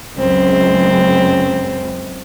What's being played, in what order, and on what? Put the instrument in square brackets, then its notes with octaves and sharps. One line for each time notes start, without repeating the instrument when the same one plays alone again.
[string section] C#2 F#2 [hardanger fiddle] C4